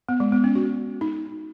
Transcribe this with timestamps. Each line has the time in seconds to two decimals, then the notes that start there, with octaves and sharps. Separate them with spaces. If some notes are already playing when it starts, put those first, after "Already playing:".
0.09 B3
0.20 G#3
0.32 B3
0.44 C#4
0.55 F#4
1.01 D#4